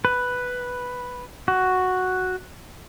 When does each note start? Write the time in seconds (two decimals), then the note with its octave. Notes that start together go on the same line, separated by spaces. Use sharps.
0.05 B4
1.48 F#4